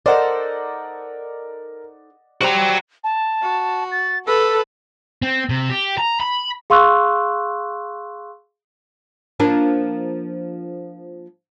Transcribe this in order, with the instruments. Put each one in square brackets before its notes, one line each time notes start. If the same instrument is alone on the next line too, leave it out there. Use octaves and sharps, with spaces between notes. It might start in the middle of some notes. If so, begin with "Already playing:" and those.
[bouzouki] D#4 A4 C5 [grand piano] A#4 [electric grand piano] D5 D#5 F#5
[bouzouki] G3 C5 G5 [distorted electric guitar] F#4 A#5
[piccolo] A5
[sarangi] F#4
[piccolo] A6
[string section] A4 [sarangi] B4 [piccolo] E6
[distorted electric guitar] C4
C3
G4
A#5
B5
[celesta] G#4 F5 C6 C#6 E6 F#6
[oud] F3 A#3 D4